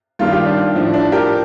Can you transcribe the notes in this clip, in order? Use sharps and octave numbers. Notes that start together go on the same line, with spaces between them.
G2 D#3 G3 F4
G4
D4 F4
A2 F3 D4
D4
G4 A#4